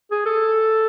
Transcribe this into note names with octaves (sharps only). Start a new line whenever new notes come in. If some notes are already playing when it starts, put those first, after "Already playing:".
G#4
A4